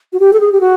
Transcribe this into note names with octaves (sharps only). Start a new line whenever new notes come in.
F#4
G4
A4
G#4
G4
F#4